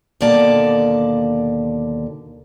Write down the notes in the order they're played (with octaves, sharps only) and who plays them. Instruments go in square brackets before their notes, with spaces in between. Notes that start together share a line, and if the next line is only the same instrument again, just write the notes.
[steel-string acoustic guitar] D#2 B2 D3 A#3 D5 A5